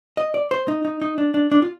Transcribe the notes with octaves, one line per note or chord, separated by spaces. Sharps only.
D#5
D5
C5
D#4
D#4
D#4
D4
D4
D4
F4